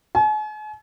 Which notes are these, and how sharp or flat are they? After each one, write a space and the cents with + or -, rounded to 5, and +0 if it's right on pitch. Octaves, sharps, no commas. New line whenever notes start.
G#5 +45